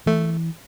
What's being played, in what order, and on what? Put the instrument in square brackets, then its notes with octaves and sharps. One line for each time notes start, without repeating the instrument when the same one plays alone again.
[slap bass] E3 [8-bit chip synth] A3